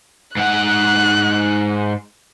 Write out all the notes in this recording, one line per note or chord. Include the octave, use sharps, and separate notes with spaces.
G#2 F#5 F#6